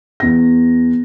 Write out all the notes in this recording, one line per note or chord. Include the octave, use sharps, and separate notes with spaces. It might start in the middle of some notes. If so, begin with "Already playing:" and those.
E2 A#6